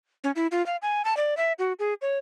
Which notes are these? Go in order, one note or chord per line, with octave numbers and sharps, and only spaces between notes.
C#4
E4
F4
F5
G#5
A5
D5
E5
F#4
G#4
C#5